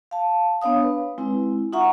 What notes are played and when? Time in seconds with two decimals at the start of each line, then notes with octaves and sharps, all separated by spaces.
0.11 F5 A5
0.62 B3 D4 C#5 F5 D#6
0.83 B4
1.18 G#3 C4 E4
1.73 D#4 F4 E5 F#5 A#5 C#6